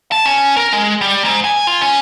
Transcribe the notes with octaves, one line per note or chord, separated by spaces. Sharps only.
A5
C#4
A#4
G#3
G3
G#2
G#5
F4
C#4